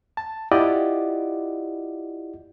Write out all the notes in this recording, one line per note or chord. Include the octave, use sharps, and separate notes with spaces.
A5
E4 F4 G4 D5 D#5 F#5